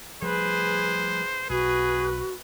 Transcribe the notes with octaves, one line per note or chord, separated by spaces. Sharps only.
F3 G3 A3 G#4 B4 C5
B1 F#4 G#4 B4